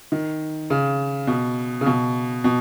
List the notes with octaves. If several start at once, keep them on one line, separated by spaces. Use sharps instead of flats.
D#3
C#3
B2
C#3
B2
B2